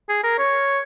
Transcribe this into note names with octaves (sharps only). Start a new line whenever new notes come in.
G#4
A#4
C#5